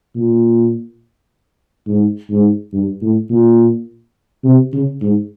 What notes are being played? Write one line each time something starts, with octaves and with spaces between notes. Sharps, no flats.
A#2
G#2
G#2
G2
A2
A#2
C3
C#3
G#2